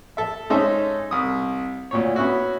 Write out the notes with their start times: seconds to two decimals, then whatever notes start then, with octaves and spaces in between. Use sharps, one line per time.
0.17 A4 E5
0.50 G#3 C#4 D#4 A4 C5 E5
1.11 C2 D#6
1.91 D2 A#2 C#5
2.16 B3 C#4 E4 F#4